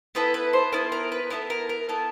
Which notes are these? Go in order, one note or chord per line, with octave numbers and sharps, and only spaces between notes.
B3 E4 A4 B4
B4
C5
B3 E4 A4 A#4
A#4
B4
B3 E4 A4 A#4
A#4
A#4
B3 E4 A4